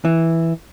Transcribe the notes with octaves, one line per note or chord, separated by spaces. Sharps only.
E3